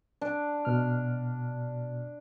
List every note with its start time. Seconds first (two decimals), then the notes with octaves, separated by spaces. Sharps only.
0.21 D4
0.65 B2 F6